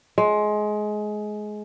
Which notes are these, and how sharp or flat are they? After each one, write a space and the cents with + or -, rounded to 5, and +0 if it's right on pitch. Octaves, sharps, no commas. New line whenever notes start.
G#3 +20